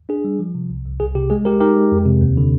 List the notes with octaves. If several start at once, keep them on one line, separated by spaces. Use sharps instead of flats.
D4 G#4
G3
F3
C3
C2
C2
C2 G#4
C3 G4
G#3 G#4
G#3 G4 A#4
D#4 G4 A#4
G#3
F2
C3
D#2
D3